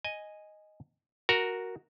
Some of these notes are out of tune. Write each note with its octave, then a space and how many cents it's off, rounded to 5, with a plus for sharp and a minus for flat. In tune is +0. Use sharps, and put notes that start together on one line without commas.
D#5 +0 G#5 +0
F#4 +0 A#4 +0